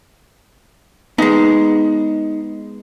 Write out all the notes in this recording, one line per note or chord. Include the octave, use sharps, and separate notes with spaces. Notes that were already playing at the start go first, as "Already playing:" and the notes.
G#3 B3 D#4